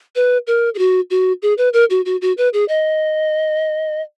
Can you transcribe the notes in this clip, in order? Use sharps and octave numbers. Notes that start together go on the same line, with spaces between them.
B4
A#4
G#4
F#4
F#4
G#4
B4
A#4
F#4
F#4
F#4
B4
G#4
D#5